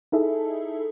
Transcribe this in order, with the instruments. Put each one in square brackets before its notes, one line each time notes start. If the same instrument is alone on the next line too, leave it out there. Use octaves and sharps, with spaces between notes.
[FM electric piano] D#4 E4 G#4 A4 E5